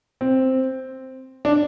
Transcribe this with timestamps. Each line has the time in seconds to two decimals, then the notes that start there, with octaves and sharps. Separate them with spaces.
0.21 C4
1.45 D4